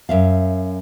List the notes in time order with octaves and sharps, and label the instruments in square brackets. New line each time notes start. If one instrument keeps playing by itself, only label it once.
[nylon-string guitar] F#2 E5 F5